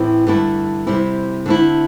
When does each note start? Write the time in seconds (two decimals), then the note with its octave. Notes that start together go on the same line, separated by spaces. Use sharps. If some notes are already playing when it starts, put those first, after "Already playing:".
Already playing: A2 E3 C4 E4
0.27 G2 D3 A3 E4
0.87 C3 G3 C4 E4
1.46 D3 A3 C4 E4